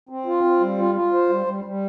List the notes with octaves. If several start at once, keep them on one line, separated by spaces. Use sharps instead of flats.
C4
F4
C4
G3
F4
F4
C5
G3
G3
G3